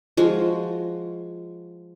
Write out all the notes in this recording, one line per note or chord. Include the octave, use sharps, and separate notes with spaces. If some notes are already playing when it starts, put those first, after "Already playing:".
F3 G#3 F#4